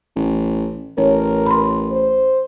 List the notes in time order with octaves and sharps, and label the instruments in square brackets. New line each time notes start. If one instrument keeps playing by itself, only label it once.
[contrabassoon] A1
[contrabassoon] A1 [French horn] A#4 [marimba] C#5
[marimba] B5 C6
[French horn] C5